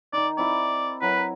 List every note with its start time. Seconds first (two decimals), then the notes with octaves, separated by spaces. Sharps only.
0.13 D#3 D#4 D5
0.38 C4 E4 D5 C6
1.02 F#3 E4 A#4 B4